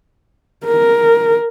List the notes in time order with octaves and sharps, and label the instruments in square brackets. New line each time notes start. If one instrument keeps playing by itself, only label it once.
[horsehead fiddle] A#4